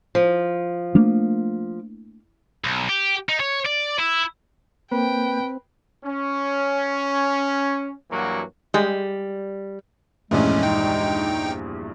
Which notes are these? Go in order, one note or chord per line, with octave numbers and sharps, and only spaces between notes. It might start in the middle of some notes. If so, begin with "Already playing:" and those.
F3
A3 A#3 D4
B1
G4
D#4
C#5
D5
E4
A#3 C4 B4 G5
C#4
G2 E3 F#3 A#3 F#4
G3 G#3
A#1 E2 G2 G#3 A3 C#4
D#4 G5